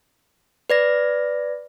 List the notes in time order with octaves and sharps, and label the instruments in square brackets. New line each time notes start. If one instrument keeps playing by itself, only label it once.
[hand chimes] B4 D5 A#6